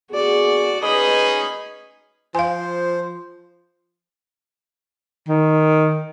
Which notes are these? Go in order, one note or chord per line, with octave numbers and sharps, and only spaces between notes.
D3 B3 F#4 G#4 D5
C#4 D#4 G#4 B4 D#5 B5
F3 C5 F5 G#5
D#3